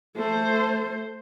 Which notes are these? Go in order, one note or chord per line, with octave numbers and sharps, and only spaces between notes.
A3 C5